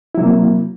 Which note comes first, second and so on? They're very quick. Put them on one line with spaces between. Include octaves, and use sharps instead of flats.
E4 F#3 C3 A#3